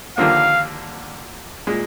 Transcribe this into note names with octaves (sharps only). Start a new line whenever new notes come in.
D#2 D3 F3 A#3 F5
A#2 G#3